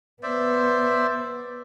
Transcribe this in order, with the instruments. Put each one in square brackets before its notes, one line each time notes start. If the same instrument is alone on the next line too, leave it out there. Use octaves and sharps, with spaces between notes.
[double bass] B3 [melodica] C5 D5 E5